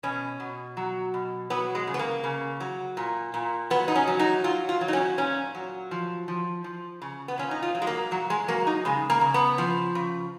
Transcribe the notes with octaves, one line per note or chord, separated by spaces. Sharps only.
B2 C#4
B2
F#3
B2
F#3 B3
G#3
C#3
B3
A#3
C#3
F#3
A#2
A#2
F#3 B3
D#4
C#4
F#3
D#4
F#3 F4
F4
F#3
D#4
C#4
A#2 C#4
F#3
F3
F3
F3
C#3
B3
A#2 C#4
D#4
F4
F#3
G#3
A#3
A#2 F#3
G#3
F#3 A#3
D#4
C#3 G#3
A#3
C#3
B3
F3
C#3